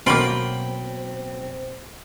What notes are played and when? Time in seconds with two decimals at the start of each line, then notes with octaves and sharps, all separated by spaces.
0.06 B2 F#3 A#3 C4 F4 G5 B5